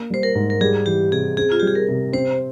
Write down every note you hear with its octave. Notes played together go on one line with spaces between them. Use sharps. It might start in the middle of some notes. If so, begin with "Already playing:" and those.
Already playing: A#3
G3 C5
A#4
G#2
A#4
G3 G#4
E3 G4
C3 G#4
C4 G#4
F4
G3 G4
G#4
A#4
C3
C4 C5